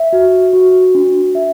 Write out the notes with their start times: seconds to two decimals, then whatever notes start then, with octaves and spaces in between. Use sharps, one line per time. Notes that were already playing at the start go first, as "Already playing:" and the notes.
Already playing: E5
0.13 F#4
0.53 F#4
0.95 D4
1.35 E5